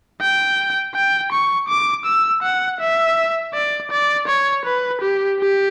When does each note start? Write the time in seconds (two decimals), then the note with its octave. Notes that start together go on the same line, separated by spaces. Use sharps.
0.21 G5
0.95 G5
1.32 C#6
1.68 D6
2.05 E6
2.42 F#5
2.80 E5
3.54 D5
3.91 D5
4.27 C#5
4.65 B4
5.02 G4
5.40 G4